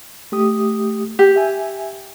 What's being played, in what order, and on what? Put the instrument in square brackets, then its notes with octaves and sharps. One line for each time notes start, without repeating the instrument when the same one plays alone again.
[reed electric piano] A3 G4 D#6
[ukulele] G4
[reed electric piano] E5 G#5